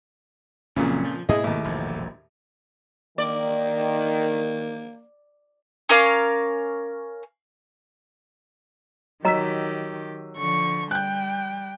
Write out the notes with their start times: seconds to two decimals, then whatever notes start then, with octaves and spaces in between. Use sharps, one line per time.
0.76 F#1 F2 A#2 C#3 F#3
1.04 F3
1.29 G#2 B2 A#3 E4 G#4 D#5
1.44 D#2 A2
1.64 E1 A#1 F2
3.18 D#3 A#3 D5
5.89 C#4 A#4 F5 D6
9.25 D#3 F#3 G4 D#5 A#5 E6 B6
10.38 D3 F3 C#6
10.91 G3 G5 F#6 G6